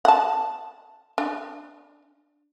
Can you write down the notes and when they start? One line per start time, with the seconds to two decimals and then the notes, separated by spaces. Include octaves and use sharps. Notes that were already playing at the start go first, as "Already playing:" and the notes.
0.05 F#5 A5
1.18 D4